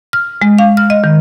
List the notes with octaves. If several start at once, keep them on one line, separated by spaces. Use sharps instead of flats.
F6
G#3
F5
F6
D#5
D#3